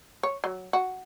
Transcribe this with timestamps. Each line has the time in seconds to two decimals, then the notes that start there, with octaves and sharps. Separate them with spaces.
0.23 C#5
0.44 F#3
0.73 F#4